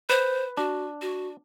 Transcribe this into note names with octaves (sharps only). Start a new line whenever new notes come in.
B4 C5
D4 F#4
F#4